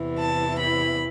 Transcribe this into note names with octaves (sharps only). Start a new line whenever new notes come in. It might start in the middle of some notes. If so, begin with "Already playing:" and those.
Already playing: E2 C3 E3
A5
B5